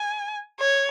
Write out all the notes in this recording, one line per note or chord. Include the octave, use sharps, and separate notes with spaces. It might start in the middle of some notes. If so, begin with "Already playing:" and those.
Already playing: G#5
C#5